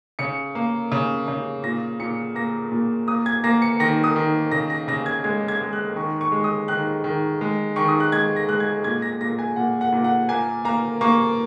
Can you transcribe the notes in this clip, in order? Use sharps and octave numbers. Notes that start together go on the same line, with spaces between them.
C#3 C#7
A#3
C#3
C#3
A#2 A#6
A#2 C#7
A#3 A#6
A#2
A#3 D#6
G#6
A#3 A#6
C#7
D#3 A#6
D#6
D#3
C#3 A#6
A#6
C#3 A#6
G#6
G#3 G#6
G#6
G#3
F#6
D#3 C#6
C#6
G#3
D#6
D#3 F#6
D#3
G#3
D#3 C#6
D#6
F#6
G#3 G#6
A#6
G#3 F#6
G#6
A#2 G#6
A#6
A#2 A#6
G#5
A#2 F#5
F#5
A#2
F#5
A#3 G#5
A#3 A#5
A#3 C#6